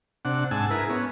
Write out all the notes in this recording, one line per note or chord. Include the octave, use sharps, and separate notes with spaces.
C3 D4 F#5
G#2 G#5 A5 E6
E4 G#4 A#4 B4
B3 C#4